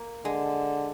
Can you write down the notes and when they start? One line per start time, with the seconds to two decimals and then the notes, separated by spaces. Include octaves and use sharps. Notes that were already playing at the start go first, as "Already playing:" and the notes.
Already playing: A#3
0.25 D3 G#3